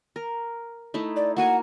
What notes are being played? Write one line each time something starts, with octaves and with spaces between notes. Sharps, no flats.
A#4
A3 D#4 E4
D5
A#3 F#4 F#5 G#5